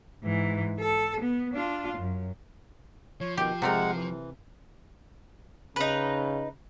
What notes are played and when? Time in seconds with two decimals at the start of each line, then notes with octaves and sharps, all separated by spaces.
0.23 G#2 E3
0.80 A4
1.21 B3
1.54 D4 F4
1.98 F#2
3.21 F3 C#5
3.37 B2 D#3 G4
3.62 C3 G#3 A3 A#4 F#5
3.95 E3
5.76 C#3 D#4 B4